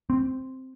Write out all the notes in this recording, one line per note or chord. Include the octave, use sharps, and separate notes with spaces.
C4